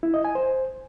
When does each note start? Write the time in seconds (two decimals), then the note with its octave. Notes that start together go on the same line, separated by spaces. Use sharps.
0.03 E4
0.14 D#5
0.25 G#5
0.35 C5